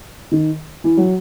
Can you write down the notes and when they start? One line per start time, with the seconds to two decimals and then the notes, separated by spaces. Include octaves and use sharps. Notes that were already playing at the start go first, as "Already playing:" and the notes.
0.32 D#3
0.84 E3
0.97 F#3